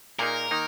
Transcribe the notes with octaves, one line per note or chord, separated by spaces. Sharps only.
A#2 A#3 D#4 G#4 A#4
D#3 A#3 D#4